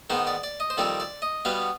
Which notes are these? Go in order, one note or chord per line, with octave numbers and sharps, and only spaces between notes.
G#2 D#3 B3 C5
D5
D5
D#5
C5
F2 D#3 G3 C4 D5
D5
D#5
B2 G3 B3 F5